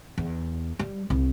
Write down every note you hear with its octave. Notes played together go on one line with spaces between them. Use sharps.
E2
G3
C2